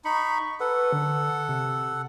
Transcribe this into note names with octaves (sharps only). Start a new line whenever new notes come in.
D#4 B5 C#6
A4 B4 F#5
D3
C3